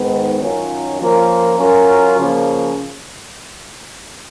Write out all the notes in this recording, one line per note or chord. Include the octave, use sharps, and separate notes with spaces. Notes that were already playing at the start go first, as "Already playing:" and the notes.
Already playing: G#2 D#3 G#3 B3
F#2 D#3 F#3 C#4 F4
F3 A#3 C#4 F4 A#4
F#3 C#4 F4 A#4
C#3 F3 A#3 C#4